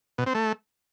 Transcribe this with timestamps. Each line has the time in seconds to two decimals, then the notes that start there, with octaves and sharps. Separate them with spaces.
0.18 B2
0.26 C4
0.35 A3